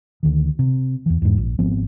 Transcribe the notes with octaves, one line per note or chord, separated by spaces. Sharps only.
D2 D#3
C3
E2 E3
E2 G#2
A#1
G#1 F3 B3 C4